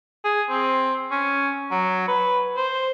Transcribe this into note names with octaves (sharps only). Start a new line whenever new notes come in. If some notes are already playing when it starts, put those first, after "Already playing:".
G#4
C4
C#4
F#3
B4
C5